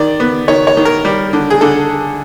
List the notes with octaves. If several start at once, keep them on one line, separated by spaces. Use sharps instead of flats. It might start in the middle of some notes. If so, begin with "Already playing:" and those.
Already playing: D#3 D5
B3
D#3 C#5
C#5
D#3
A#4
G3
D3
G#4
D3 A4